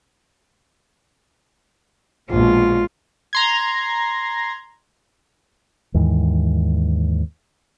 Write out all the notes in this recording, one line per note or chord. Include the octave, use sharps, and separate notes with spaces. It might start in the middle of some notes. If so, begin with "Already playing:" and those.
A#1 B2 G#3 F4
A#5 C6 G#6
D#2 G#2 E3